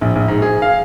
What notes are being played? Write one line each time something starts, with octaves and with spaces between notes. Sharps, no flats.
A#1
A#1
G#2
G#4
F5